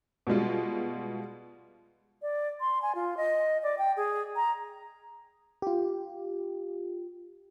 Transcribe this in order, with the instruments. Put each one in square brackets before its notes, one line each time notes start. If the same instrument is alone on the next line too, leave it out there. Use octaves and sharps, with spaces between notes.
[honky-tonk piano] B2 G3 G#3 F4
[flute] D5
C6
G#5
F4
D#5
D5
G5
G#4
A#5
[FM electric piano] F4 G4